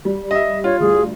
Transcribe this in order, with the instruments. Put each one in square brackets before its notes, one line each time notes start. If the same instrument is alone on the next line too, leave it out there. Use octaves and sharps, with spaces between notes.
[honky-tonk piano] G3
[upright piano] D#5 E5
[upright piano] F4 [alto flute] C#5
[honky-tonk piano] D2 G2 [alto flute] G#4